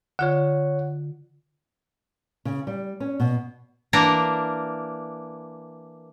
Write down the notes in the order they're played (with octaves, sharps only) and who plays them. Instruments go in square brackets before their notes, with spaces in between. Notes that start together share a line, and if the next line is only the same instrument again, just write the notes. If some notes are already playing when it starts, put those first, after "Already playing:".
[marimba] D3 F4 [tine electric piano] C#5 F#5
[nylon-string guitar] C#3
G3
C#4
B2
[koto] E3 A#3 D4 A#4